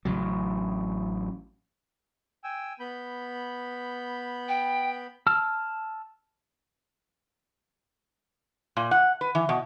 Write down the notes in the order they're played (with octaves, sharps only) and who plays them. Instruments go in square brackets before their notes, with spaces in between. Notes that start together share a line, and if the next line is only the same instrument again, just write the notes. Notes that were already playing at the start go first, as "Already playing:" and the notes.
[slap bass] A1 C#3 F#3
[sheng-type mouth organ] G5 G#5 E6
B3 B5 G6
[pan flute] G5
[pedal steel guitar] A5 E6 F6
[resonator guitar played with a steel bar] A#2
F#5
B4
E3
B2